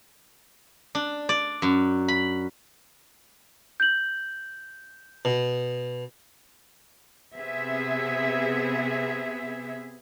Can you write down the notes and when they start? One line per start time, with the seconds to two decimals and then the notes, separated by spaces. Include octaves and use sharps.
0.95 D4
1.29 D5
1.62 F#2
2.08 B5
3.80 G6 F#7
5.25 B2
7.35 C3 B3 G#4 E5